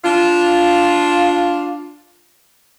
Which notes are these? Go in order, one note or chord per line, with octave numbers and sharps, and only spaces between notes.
D4 F4